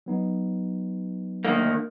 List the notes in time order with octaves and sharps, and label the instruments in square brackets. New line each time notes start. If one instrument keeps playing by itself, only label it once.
[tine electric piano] F#3 B3 D#4
[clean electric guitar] D2 D#3 A#3